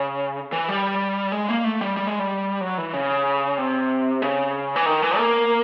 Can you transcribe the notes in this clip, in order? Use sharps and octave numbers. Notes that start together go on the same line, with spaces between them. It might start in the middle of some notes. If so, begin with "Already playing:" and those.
Already playing: C#3
E3
G3
G#3
A#3
A3
G3
G3
G#3
G3
F#3
E3
C#3
C3
C#3
E3
D#3
E3
A#3